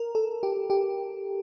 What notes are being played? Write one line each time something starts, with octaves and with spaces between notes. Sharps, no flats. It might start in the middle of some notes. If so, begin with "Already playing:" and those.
Already playing: A#4
A4
G4
G4